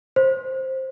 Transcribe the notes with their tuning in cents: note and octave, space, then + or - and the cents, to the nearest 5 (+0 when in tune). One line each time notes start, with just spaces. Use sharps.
C5 +10